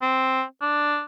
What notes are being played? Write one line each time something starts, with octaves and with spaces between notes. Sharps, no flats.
C4
D4